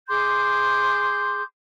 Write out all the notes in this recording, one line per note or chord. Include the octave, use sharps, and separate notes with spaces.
G#4 C6 D6 G6